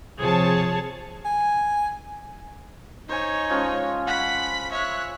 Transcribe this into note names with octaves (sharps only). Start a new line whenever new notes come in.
C3 F3 G#4 C#5 A5
G#5
D#4 C5 C#5 G#5
F3 G#3 C#4
F#5 B5 B6
C#5 E5 F#6